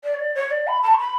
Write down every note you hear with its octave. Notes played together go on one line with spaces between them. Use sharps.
D5
C#5
D5
C#5
D5
B5
A5
C#6
B5